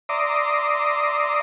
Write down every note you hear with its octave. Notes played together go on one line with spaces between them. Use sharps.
D5 E5 A#5 C6 D6 D#6